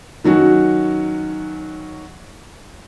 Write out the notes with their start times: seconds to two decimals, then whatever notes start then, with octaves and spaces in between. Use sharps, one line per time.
0.24 D#3 F#3 C#4 F#4